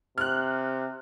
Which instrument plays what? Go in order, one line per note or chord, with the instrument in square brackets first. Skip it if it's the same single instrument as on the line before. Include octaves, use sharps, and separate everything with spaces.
[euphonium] C3 [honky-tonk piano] F6 F#6